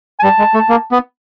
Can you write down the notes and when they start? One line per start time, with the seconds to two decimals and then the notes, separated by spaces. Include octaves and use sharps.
0.20 G#5
0.23 G3 A5
0.39 G#3
0.54 A3
0.69 A#3
0.92 B3